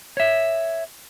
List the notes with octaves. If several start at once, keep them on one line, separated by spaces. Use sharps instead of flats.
C#5 E5